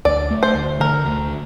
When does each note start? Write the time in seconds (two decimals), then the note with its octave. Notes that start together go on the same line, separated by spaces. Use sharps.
0.05 D2 D5
0.31 A3
0.43 C5
0.55 D2
0.80 D3 A#4
1.06 D2